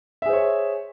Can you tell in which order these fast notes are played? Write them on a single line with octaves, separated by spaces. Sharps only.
E5 G#4 C5 C#5